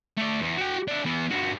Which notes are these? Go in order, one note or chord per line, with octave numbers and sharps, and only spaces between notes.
A3 D5
E2
F#4 G5
D4 E4
E3 B3
G2 F#4